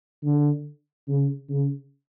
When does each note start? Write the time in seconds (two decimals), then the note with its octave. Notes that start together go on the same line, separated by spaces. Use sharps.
0.23 D3
1.08 C#3
1.50 C#3